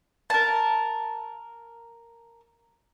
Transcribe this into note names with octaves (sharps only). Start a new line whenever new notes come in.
A#4 A5